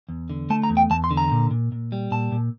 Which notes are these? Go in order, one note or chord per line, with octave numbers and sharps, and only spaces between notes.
E2
D3
A3 A5
A#5
E2
G5
E2 A5
C6
D3
A#5
A#2
A#2
A#2
G3
A#2 A5
A#2